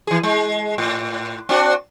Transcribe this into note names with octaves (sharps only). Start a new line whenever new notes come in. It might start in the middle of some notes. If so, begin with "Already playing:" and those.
E3 G#4
G#3
A2
C4 D4 F#4